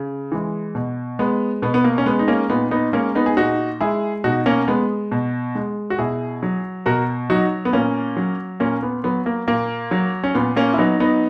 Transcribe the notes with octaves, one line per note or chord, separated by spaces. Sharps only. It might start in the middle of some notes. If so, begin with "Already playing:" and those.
Already playing: C#3
E3 G#3
B2
G#3 B3
B2 B3
B3
A#3
C#4
G#3 B3
D#4
A#3 C#4
A#2 B3 D#4
B3 D#4
G#3 A#3 C#4
B3 D#4
G#4
A#2 D#4 F#4
G#3 E4 G#4
B2 D#4 F#4
A#3 C#4
G#3 B3
B2
G#3
F#4
B2 E4 G#4
F#3
B2 F#4 A#4
F#3 D#4 F#4
B3
A#2 A#3 C#4
F#3
A#2 A#3 C#4
B3
F#3 B3
A#3
A#2 A#3
F#3
C#4
A#2 B3
A#3 C#4
E4
F#3 B3 D#4
B3 D#4